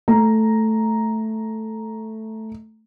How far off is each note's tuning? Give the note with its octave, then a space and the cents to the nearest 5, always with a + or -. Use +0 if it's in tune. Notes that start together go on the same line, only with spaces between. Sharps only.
A3 +0 A#5 +0